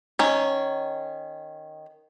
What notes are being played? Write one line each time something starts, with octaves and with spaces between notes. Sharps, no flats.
D#3 C#4